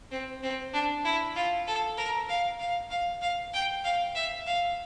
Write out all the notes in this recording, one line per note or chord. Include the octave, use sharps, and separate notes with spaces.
C4
C4
D4
E4
F4
A4
A#4
F5
F5
F5
F5
G5
F5
E5
F5